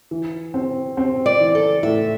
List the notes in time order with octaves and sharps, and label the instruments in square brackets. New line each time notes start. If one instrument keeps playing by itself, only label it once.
[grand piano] E3
C4
C4
[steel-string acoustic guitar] D5
[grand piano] E3
[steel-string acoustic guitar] A4
[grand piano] A2 [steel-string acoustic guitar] E5